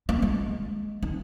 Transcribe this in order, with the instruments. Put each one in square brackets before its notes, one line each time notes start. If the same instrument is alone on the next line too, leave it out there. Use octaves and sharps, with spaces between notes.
[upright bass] A#3
G#3
D#3